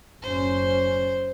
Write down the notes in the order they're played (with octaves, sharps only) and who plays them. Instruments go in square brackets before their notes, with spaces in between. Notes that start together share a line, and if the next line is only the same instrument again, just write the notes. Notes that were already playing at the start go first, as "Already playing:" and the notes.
[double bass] F#1 C#4 [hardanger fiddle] C5